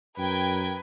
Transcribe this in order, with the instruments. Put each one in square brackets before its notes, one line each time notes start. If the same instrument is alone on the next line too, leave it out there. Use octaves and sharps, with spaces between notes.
[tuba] F#2 [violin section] A#4 G5 G#6 [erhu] B4